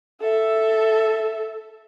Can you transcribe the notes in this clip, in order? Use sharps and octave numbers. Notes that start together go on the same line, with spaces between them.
A4 E5